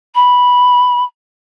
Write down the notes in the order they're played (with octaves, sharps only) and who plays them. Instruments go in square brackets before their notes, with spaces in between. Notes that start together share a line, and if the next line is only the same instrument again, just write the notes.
[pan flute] B5